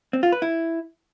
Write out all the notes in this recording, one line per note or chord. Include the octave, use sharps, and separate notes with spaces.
C4
F4
B4
E4